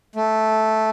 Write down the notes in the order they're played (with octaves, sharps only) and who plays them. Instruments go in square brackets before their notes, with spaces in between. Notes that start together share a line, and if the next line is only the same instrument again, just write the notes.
[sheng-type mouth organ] A3